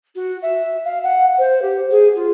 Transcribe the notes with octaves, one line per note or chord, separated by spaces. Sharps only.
F#4
E5
F5
F#5
C5
G4
G#4
F4